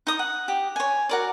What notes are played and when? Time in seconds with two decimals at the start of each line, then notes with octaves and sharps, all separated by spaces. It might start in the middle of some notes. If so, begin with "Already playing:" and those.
0.07 D#4 D#6
0.19 F#5
0.48 G4
0.76 C#5 G#5
1.09 F#4 A#4 D5